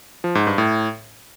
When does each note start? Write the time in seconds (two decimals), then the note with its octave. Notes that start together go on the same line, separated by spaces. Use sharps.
0.24 F3
0.35 G#2
0.47 G2
0.58 A2